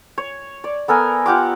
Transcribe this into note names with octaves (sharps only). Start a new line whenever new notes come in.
C#5
D5
B3 A4 A#4 G#5
F4 G4 F#5 D6